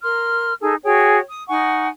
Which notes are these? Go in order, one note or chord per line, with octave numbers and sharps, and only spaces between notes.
A#4 C6 F6
D#4 G#4 A4 G#5
F#4 G#4 C#5 G5
D#6
D#4 F#5 G#5 C#6